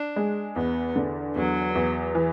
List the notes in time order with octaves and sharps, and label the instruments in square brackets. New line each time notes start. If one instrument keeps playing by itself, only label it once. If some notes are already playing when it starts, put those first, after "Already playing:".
Already playing: [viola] D4
[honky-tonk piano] G#3
[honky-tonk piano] E2 [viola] B3
[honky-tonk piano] D3
[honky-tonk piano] E2 [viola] F#3
[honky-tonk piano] E2
E3